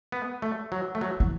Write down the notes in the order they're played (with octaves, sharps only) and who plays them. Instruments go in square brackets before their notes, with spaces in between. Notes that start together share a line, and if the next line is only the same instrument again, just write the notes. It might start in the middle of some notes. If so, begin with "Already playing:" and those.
[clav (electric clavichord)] B3
A3
F#3
A3
F#3
[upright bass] E3